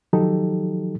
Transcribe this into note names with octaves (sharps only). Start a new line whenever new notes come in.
D#3 F3 F#3 D#4 G4 A4